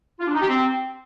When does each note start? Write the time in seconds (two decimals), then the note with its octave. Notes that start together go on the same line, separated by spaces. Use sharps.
0.20 F4
0.27 D4
0.34 D#4
0.41 G4
0.48 C4